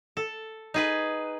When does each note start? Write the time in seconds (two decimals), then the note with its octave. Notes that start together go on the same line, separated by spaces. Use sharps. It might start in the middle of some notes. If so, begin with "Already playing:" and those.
0.17 A4
0.74 D#4 G#4 B4